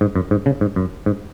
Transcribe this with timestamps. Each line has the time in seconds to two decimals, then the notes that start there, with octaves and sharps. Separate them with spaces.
0.01 G#2
0.16 F#2
0.31 G#2
0.46 C#3
0.61 G#2
0.76 F#2
1.06 G#2